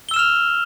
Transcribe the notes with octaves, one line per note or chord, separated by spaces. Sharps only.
E6 F6 E7 F7 G7